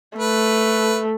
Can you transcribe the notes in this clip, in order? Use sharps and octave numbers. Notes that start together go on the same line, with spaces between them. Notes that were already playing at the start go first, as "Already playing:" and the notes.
A3 B4